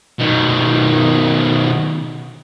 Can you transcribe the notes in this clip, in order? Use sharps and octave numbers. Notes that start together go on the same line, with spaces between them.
B2 D#3